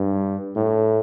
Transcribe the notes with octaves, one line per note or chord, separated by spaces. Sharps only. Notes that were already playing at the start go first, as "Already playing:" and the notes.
Already playing: G2
A2